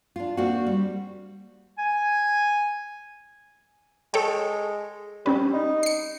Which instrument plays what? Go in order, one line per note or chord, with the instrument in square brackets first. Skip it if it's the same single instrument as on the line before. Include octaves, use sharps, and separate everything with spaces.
[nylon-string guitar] D4 F4
A#3 C4 D4 F#4
G3
[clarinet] G#5
[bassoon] G#3 [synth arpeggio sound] A4 C#5 G5
[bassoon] G3 [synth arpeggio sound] C4 C#4 B4
[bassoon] D#4
[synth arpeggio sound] C7 C#7